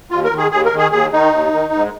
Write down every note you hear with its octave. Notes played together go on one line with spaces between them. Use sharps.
D#2 F4
A#4
D#3
G#4
D#2 G#4
A#4
D#3
G#4
D#2 G#4
D#3 D#4
D#2
D#3
G#2